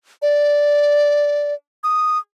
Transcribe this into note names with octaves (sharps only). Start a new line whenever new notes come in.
D5
D#6